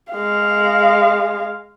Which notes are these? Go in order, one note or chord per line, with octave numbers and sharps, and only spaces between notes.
G#3 F5